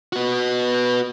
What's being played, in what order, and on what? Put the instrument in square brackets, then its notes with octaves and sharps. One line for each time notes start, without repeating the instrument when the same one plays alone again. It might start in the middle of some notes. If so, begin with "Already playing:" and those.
[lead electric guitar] B3 F#4